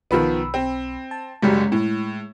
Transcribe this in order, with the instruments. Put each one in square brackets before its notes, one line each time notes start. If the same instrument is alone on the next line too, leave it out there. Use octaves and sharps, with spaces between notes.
[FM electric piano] B1 B5 E6 [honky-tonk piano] D#3 F3 B3
[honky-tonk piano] C4
[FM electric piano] A5
[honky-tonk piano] F#1 F#2 G3 [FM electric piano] G#3
[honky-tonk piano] A2